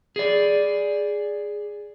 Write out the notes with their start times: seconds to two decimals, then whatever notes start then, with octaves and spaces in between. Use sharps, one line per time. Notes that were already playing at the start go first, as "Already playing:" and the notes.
0.16 G#4 D5